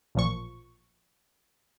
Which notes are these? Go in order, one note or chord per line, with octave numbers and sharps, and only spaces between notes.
A1 A#2 F3 C#6